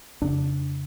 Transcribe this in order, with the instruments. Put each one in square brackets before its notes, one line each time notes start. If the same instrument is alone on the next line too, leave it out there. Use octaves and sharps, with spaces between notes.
[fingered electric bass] F2 C#3 D4